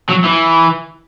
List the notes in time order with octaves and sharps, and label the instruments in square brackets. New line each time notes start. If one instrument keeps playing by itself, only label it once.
[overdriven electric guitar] F#3
E3